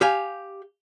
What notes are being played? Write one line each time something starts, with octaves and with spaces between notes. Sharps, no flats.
G4 F5 G#5